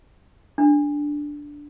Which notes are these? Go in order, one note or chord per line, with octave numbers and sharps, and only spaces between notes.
D4